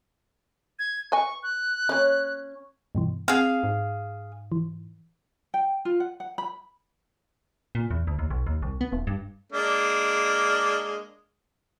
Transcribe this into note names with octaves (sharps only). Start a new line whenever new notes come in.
G#6
B4 D#5 G#5 C#6
F#6
A#3 C#4 D#5
G2 B2 E3
C4 G#4 F5 F#5
G#2
E3
G5
F4
F#5
F#5
B5
A#2
E2
D2
D#2
B1
D#2
C2
B3
D#1
G2
G#3 A#3 D4